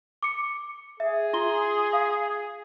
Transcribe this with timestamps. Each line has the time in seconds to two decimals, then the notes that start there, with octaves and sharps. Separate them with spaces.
0.23 D6 C#7
1.00 G#4 E5
1.33 F4 C6 G7
1.93 F5